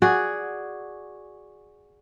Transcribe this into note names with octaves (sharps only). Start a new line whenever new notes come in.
F#4 G#4 D5